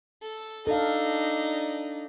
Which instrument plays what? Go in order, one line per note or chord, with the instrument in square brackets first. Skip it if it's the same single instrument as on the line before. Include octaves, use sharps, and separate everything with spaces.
[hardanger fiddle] A4
[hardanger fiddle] D4 D#4 [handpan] A4 F5